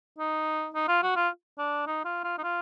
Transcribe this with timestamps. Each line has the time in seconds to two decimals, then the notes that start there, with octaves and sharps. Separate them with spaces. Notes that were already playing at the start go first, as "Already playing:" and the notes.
0.18 D#4
0.74 D#4
0.88 F4
1.03 F#4
1.16 F4
1.58 D4
1.87 D#4
2.05 F4
2.24 F4
2.38 D#4
2.43 F4